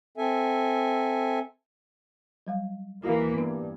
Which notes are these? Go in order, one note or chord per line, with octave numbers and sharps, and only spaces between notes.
C4 A4 E5 G#5
F#3 G3 F5
D#2 E3 A#3 E4 F#4 F5
G2 B3 D4